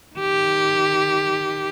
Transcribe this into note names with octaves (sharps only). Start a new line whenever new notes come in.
D#3 G4